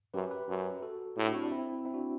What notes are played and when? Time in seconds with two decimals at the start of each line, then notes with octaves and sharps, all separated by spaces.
0.14 F#2 G4 B4
0.31 G4 B4
0.48 F#2
0.82 F#4 A4
1.17 A2 E4 G4
1.25 D4 F#4
1.34 C4 E4
1.43 D4
1.51 C4 E4
1.85 C4 E4
1.94 D4 F#4